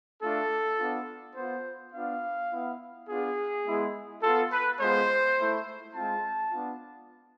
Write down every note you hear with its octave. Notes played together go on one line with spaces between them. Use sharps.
A3 D4 F4 A4
B3 D4 F4
B3 F4 C5
B3 D4 F4 F5
B3 E4
B3 D4 F4 G#4
G#3 B3 E4
B3 F4 A4
B4
G#3 B3 F4 C5
A3 E4
G#3 C4 F4 A5
B3 D4 F4